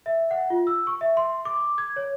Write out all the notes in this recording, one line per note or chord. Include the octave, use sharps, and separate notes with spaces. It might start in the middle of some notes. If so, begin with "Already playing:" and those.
E5
F#5
F4
E6
C#6
E5
C6
D6
G#6
C#5